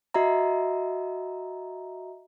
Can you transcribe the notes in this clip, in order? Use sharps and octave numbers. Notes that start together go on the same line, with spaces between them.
F#4 D#5 E5 A#5